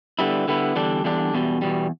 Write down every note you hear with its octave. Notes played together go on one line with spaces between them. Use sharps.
D3 G3 B3 E4
D3 G3 B3 E4
E2 D3 G3 D4
E2 D3 G3 D4
E2 B2 G3
E2 B2 G3